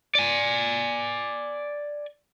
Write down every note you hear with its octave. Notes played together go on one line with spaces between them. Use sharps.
D5 G#5